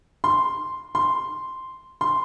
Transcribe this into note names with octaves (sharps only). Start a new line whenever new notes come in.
C6
C6
C6